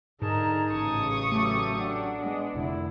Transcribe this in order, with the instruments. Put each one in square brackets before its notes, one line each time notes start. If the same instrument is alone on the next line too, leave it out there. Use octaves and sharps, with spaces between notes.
[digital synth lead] G#2 [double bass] D3 [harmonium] D#4 G#4 A5 [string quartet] A#4
[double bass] A1 [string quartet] C#3 C#6 D#6
[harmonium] F#3 G4 A4 [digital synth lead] A3
[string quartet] D4 [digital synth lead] F#5
[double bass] G#3 [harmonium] B3
[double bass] F1 D3 [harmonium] E4